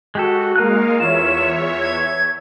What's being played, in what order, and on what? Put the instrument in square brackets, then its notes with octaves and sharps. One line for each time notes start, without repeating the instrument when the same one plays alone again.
[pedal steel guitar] G#3 G4 A4 [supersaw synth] F#4
[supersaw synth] G#3 A#4 F5 [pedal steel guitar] A#3 D#4 F#6
[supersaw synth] E2 C#5 E5 [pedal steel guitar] F4 [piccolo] E7
[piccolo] G#6